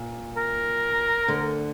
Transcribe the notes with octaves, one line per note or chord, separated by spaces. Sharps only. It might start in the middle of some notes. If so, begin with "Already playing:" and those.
Already playing: A#2
A#4
D2 D3